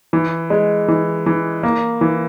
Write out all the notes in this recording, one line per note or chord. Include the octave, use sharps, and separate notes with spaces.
E3
G#3
E3
E3
A#3
E3